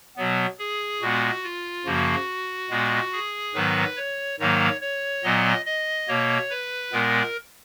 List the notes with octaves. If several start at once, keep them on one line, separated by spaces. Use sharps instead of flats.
B2 F#3 B3
G#4
A#2 G#3 B3 F#4
F4
F#2 C#3 F3 A#3 F#4
A#2 G#3 B3
G#4
G#2 D#3 F#3 B3 B4
C#5
G#2 D#3 F#3 A#3 C#5
C#5
A#2 F#3 B3 D#5
D#5
B2 A#3 C#5
B4
A#2 G#3 B3 A#4